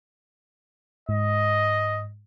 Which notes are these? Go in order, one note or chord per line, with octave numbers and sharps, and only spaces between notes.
G#2 D#5